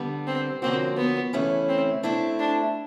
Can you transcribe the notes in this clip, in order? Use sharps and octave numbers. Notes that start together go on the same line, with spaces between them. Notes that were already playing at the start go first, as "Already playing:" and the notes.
Already playing: D3 G3 B3
C4
D3 F3 A#3 C4 C#4 F#4
B3
C#3 E3 A3 C#4 E4
C4
A3 C4 D4 E4
D4